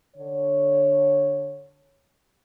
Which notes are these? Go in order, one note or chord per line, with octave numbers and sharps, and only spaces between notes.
D3 C#5